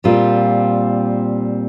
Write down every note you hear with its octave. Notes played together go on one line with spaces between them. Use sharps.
A#2 G3 C4 F4